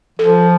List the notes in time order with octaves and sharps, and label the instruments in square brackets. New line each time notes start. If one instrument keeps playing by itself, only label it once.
[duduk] F3 [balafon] A4